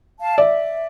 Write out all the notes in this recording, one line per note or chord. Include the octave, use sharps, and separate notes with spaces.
F5 A5
D5 E5